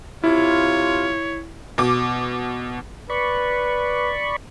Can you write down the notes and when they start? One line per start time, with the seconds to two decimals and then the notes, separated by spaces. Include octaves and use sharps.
0.24 C3 E4 F4 C#5
1.78 B2 D6
3.10 B4 D5 B5 C#6